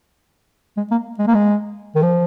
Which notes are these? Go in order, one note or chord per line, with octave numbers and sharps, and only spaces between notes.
G#3
A#3
G#3
A#3
G#3
D#3
F3